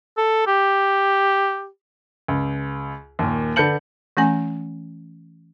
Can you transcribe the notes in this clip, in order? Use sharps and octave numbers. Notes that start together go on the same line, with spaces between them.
A4
G4
C#2
D#2 A#2
D3 B4 A5 G6 C#7 F#7
E3 A3 C#4 G#5